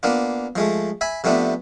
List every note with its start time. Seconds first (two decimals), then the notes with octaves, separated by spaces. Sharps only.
0.03 A#3 B3 D4 F4
0.55 F3 G#3 A3
1.01 E5 G#5 B5
1.24 C3 F3 A3 B3 D4